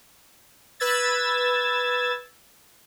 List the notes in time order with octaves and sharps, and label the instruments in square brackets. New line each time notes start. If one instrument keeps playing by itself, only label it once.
[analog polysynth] B4 E6 G#6 A6